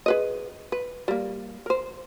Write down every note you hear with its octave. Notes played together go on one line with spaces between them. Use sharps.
G#4 B4 D#5
B4
G3 A#3
A#4 C5